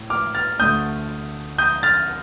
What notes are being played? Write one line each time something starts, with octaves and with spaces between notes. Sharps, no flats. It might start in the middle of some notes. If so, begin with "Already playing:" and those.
Already playing: A2
D6 F6
F6 A6
D2 D3 A3 D#6 G6
D#6 G6
F6 A6